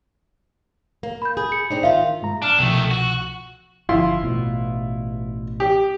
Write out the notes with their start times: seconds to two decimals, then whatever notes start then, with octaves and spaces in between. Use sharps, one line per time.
1.03 A#3
1.22 B5 G6
1.37 G#4
1.52 C#7
1.71 C4 D4 D#4
1.83 D#3 F4 E5 F5
2.22 G2 G#3 A#5
2.42 D4 A5 F6
2.58 C2 B2 D#3 F3 A3
2.91 F#4
3.89 G1 F3 E4 F4 C6
4.23 A1 B2
5.60 G4